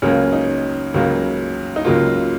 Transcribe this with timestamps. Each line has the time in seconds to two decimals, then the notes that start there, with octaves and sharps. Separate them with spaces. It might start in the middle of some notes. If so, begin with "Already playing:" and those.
0.02 C#2 C#3 F#3 A#3 C#4
0.33 D#4
0.94 C#2 C#3 F#3 A#3
1.76 D#4
1.85 C#2 C#3 F#3 A#3 F4